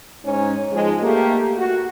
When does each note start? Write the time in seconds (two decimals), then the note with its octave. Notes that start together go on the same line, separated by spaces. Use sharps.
0.24 G#2 C#4
0.71 G#2 F3 G#3
1.02 A3 A#3 G4
1.58 F#4